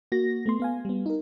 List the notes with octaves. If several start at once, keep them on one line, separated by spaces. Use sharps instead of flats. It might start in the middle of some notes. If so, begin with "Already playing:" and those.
A#3 F#4 A#6
A3 B3 C6
B3 F5 G#5
G3 B3
D#4 A#4